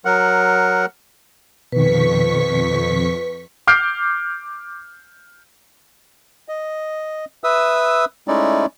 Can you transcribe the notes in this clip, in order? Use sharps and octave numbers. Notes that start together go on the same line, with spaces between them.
F#3 A#4 F#5
F2 B2 D#3 B4 C#6 B6
D6 F6 G6 C7 D7
D#5
B4 E5 D#6 E6
G#3 A3 C#4 D#4 E4 D5